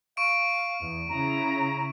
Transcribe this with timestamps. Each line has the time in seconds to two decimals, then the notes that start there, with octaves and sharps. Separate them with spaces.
0.17 F5 C#6 D7
0.79 E2
1.09 C#3 E4 A#5